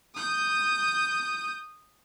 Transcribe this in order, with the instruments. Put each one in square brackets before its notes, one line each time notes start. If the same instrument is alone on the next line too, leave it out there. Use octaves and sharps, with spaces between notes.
[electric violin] D#6 G6